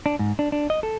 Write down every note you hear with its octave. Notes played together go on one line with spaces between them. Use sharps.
D4
G#2
D4
D4
D#5
A4